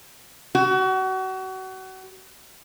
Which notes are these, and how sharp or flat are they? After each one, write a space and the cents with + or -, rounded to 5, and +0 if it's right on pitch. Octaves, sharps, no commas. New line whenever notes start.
F#4 +30